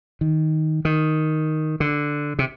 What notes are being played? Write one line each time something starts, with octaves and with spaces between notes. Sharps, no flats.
D#3
D#3
D3
C3